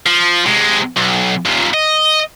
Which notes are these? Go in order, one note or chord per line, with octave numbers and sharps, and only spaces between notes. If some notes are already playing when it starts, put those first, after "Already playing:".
F3
C3 G#3
B1
D#2 A#2
D#5